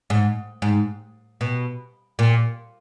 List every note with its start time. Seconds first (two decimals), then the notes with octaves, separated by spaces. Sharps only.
0.10 G#2
0.62 G#2
1.41 B2
2.19 A#2